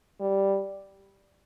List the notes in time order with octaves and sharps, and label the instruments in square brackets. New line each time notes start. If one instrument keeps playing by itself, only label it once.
[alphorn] G3